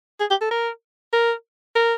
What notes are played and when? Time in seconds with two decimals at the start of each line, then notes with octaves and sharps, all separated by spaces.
0.20 G#4
0.30 G4
0.41 A4
0.51 A#4
1.13 A#4
1.75 A#4